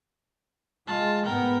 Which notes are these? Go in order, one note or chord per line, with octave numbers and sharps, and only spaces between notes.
G#3 F4 A5
G#2 B3 A#4 G5